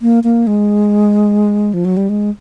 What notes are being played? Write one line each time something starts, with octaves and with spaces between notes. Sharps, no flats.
A#3
A#3
G#3
F3
F#3
G3
G#3